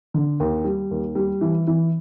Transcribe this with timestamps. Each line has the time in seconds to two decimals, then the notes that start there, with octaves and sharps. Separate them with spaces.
0.14 D3
0.40 D#2
0.64 G3
0.91 D#2
1.15 G3
1.41 E3
1.67 E3